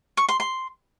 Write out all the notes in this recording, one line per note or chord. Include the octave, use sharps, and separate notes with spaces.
C#6
C6
C6